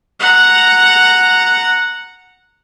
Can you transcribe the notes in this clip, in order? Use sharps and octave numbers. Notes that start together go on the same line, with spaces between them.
F#5 A#5